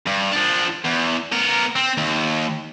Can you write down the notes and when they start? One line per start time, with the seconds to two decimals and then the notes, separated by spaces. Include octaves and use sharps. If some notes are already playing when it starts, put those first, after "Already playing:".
0.07 G2
0.33 F3 D4
0.84 E2
1.32 B3 A#4
1.76 C4
1.97 D#2